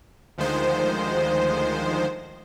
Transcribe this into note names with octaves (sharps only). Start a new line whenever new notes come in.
D2 D#3 F3 G#3 C5